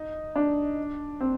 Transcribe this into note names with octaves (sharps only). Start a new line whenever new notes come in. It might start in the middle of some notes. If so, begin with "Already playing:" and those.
Already playing: D#4
D4
C4